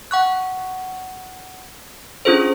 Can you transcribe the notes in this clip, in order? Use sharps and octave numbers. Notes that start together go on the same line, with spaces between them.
F#5 C#6 F#6
C#4 D4 F4 G#4 A4 C5